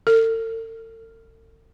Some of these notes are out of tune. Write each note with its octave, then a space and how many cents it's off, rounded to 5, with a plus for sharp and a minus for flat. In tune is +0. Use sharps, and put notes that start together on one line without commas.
A4 +45